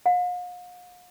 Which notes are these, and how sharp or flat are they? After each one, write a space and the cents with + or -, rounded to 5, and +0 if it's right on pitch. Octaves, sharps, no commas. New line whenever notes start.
F5 +45